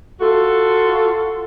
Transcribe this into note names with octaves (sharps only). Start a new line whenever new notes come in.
F4 F#4 A4